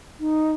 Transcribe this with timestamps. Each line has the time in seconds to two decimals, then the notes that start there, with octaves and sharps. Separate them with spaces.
0.19 D#4